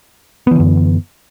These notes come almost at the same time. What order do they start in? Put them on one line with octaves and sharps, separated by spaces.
B3 E3 D3 F#2